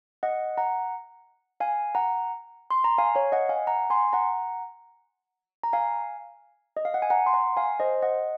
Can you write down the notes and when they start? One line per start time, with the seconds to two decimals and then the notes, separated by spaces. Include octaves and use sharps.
0.23 D#5 F#5
0.58 F#5 A#5
1.60 F5 G#5
1.95 F#5 A#5
2.70 C6
2.84 A#5
2.98 F5 G#5
3.15 C#5 F5
3.32 D#5 F#5
3.49 F5 G#5
3.67 F#5 A#5
3.90 G#5 C6
4.13 F#5 A#5
5.64 A#5
5.73 F5 G#5
6.77 D#5
6.85 F5
6.94 F#5
7.02 G#5
7.10 F#5 A#5
7.26 C6
7.34 F#5 A#5
7.57 F5 G#5
7.80 C5 D#5
8.02 D#5 F#5